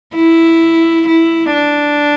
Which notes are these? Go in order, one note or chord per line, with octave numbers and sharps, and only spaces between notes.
E4
E4
D4